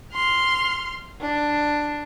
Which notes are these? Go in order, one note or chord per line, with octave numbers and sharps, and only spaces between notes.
C6 F6
D4